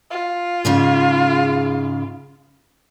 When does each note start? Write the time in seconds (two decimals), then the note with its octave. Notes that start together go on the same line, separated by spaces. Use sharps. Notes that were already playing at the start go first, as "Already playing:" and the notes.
0.10 F4
0.65 G#2 C#3 G#4